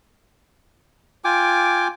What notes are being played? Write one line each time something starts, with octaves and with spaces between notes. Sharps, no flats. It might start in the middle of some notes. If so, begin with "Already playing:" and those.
F4 G5 G#5 D6